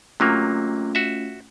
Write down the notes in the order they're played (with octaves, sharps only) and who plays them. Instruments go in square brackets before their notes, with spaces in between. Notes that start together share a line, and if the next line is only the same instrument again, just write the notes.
[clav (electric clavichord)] C3 F#3 A#3 [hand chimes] A3 C#4 F4
[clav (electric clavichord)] F#4 E5